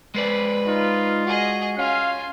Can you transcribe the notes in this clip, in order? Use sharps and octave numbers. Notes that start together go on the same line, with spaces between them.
G#3 B4 C5 D5
D#4 F4
F#4 G#4 D#5
C#4 F4 F5 G#5